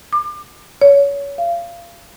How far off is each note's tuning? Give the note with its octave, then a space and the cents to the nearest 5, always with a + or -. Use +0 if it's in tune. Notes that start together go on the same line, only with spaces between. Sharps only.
D6 +35
C#5 +25
F5 -30